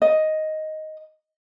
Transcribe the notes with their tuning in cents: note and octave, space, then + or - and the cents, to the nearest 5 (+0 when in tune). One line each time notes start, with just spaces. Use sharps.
D#5 +5